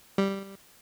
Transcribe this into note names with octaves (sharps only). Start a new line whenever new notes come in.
G3